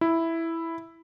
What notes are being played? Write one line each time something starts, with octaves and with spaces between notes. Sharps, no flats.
E4